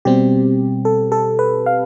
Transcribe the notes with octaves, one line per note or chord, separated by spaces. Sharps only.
B2 G3 C4 G4
A4
A4
B4
F5